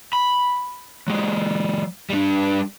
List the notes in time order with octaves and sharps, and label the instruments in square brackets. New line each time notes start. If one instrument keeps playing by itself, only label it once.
[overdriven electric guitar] B5
F#3 G#3
G3 D4